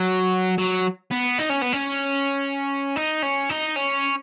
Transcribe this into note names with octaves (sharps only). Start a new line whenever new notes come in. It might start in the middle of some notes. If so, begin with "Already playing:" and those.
Already playing: F#3
F#3
B3
D#4
C#4
B3
C#4
D#4
C#4
D#4
C#4